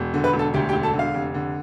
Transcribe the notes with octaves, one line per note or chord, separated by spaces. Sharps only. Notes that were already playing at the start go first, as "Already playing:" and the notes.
Already playing: E1
D3
B4 B5
E1
A4 A5
D2 G4 G5
G4 G5
E1
A4 A5
D3
F5
F1
D3